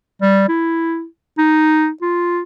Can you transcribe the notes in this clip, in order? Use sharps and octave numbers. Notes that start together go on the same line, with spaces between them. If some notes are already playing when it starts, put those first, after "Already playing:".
G3
E4
D#4
F4